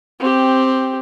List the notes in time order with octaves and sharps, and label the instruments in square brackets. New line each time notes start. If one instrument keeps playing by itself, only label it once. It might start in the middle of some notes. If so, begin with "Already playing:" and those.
[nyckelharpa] C4 G4